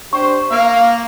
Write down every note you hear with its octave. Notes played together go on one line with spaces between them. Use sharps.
D4 G4 C5 C#6
A#3 F5